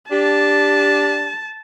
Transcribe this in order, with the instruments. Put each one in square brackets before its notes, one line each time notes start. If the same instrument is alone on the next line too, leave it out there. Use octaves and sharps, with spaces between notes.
[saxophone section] D4 G4 [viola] A5